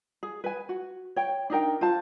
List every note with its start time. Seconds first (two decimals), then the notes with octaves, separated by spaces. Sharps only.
0.23 G#4
0.44 B4 G#5
0.69 F#4
1.16 C#5 G5
1.50 D4 D#4 A#4 G5
1.81 F4 C5 A5